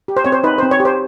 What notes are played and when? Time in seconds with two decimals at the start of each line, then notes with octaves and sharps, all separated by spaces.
0.08 G4
0.17 C5
0.25 C4 C#5
0.32 C5
0.44 D#4 B4
0.58 C4 C5
0.71 C#5
0.80 G4
0.85 C5